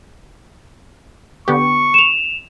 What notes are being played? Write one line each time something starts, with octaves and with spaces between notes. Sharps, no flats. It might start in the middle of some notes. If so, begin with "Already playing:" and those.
D3 B3 G4 C#6
E7 F7